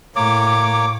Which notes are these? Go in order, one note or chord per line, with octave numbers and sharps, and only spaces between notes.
A2 A#3 C#5 D6